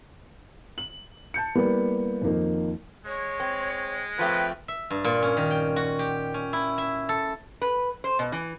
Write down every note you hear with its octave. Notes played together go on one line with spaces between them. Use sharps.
F#7
A5 G6 C#7
G3 A#3 B3 E4 G4
F2 D#3 A#3 D#4
G#3 C#5
C4
F3 A3 C4 B4 G5
E5
G2
A#2
C#4
D#3
G5
F#4
G4
C#4
E4
E5
A4
B4
C5
B2
E3